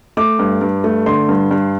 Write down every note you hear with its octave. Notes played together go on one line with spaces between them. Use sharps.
A3 D6
G2
G2
A3
D3 C6
G2
G2